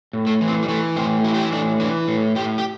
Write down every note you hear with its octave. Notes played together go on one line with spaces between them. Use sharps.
A2
A3
E3
C4
G3
E3 A3
A2 C4
E3 E4
G4
E4
A2 D4
E3 D4
A2
A2 G4
G4